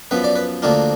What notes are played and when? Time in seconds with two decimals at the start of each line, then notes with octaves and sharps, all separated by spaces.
0.11 F#2 F3 B3 B4
0.24 D5
0.36 B4
0.62 D2 D3 F3 A#3 D4 F4